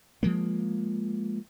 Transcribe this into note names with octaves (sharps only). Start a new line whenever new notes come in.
F3 G#3 A#3